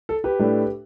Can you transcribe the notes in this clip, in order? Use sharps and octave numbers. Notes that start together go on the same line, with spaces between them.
A4
G4 B4
A2 A3 D4